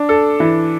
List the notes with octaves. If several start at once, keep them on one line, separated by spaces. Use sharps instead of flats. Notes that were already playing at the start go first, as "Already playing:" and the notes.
Already playing: D4
A4
E3